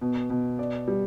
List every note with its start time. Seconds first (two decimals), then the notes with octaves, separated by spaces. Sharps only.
0.01 B2
0.30 B2
0.59 D5
0.88 G3